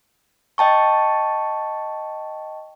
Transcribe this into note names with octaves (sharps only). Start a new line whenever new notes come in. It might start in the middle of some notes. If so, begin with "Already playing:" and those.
D#5 G5 A5 C#6